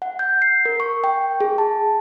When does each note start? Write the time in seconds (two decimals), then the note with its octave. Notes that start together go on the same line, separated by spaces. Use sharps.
0.02 F#5
0.19 G6
0.42 C7
0.65 A#4
0.80 C#6
1.04 G5
1.41 G#4
1.58 A5